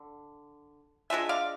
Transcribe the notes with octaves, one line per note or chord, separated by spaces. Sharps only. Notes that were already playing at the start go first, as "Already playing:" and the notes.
Already playing: D3
G#3 D4 F4 E5 G#5
D5 F5